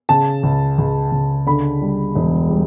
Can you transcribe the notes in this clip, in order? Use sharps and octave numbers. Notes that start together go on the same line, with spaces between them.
C#3 A5
C#2
C#2
C#2
D3 B5
G3
E1
G3